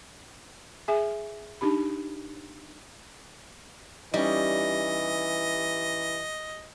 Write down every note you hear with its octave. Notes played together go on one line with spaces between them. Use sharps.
G#4 E5 G#5
D4 D#4 G4 B5
E3 G3 C#4 D#4 D#5